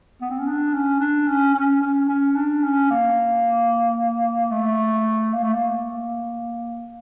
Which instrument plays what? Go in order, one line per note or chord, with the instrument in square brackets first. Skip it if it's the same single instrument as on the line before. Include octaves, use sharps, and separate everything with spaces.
[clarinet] B3
C4
C#4
D4
C#4
D4
C#4
C#4
C#4
C#4
D4
C#4
A#3
A3
A#3
A3
A#3